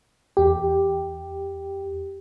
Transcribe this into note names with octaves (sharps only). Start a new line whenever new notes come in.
E2 G4